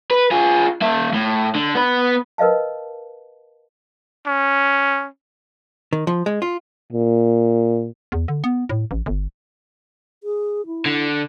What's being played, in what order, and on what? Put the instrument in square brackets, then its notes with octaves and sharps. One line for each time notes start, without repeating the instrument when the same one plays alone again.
[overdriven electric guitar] B4
F4 G#4
A#3 E5
A2
D3
B3 B5
[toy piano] A#4 B4 D#5 F5 A5
[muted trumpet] C#4
[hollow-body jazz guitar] D#3
F3
G#3
F4
[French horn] A#2
[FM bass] E2
D3
B3
A2
A1
G1
[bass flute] G#4
E4
[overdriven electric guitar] D3